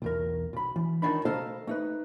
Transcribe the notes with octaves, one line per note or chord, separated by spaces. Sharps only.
B1 E2 A#4
B1 B5
E3
C#2 G2 D#3 D4 D#4 B5
A4 C5 D#5 F5 A5 A#5
A3 D#4 B4